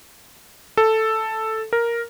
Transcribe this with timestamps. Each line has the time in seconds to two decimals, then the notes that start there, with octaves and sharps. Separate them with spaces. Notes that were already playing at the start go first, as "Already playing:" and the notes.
0.77 A4
1.73 A#4